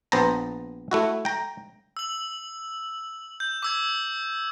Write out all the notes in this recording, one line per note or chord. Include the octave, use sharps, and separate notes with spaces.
A#1 B3 C5 A5 A#5
A3 E4 F#4
G5 A#5
E6 F#7
G6
D6 E6 G#6